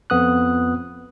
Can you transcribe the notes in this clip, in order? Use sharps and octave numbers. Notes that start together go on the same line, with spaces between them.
F2 B3 D#6 F#6